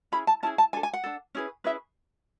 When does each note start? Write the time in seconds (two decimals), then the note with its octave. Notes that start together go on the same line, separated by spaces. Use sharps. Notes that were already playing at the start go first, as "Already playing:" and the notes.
0.12 C#4 E4 G#4 B5
0.27 A5
0.43 C#4 E4 G#4 A5
0.58 A5
0.73 D4 A4 G#5
0.83 G#5
0.93 F#5
1.04 D4 A4
1.35 C#4 E4 G#4 B4
1.64 C#4 E4 G#4 B4 E5